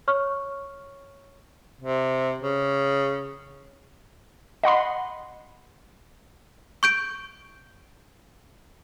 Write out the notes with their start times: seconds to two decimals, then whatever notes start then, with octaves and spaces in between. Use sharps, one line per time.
0.08 C#5 C#6 F6
1.81 C3
2.43 C#3
4.64 D#5 F#5 B5 C6
6.83 C#6 G6 D7